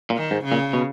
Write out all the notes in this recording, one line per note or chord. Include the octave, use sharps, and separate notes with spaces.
A#2
D#3
G#2
C#3
A#2
B2